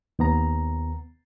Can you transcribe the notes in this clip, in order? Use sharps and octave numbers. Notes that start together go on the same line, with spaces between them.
D#2 B3 A#5